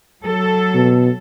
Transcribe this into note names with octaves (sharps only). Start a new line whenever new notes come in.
F#3 A4
B2